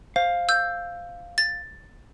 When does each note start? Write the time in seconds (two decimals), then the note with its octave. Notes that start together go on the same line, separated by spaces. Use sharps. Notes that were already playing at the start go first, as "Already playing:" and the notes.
0.16 C5 F5
0.49 E6 G6
1.38 A6